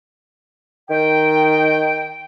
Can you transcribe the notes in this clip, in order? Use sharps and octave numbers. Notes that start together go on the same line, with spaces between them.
D#3 G5